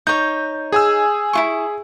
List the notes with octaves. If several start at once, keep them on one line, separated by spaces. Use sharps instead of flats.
D#4 C#5 G6
G#4 G#5 E6
E4 F4 C#6